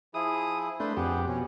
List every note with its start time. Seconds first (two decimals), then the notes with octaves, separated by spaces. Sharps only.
0.14 F3 E4 G#4 D#6
0.80 A3 D4 B4 C6 G6
0.97 F2 G4 G#4 B4 F#5
1.28 B2 C#4